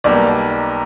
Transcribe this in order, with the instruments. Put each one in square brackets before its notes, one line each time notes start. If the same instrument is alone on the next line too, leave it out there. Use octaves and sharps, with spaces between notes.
[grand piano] B1 B2 G3 A#3 D5